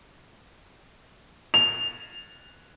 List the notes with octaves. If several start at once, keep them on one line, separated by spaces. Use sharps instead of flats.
F7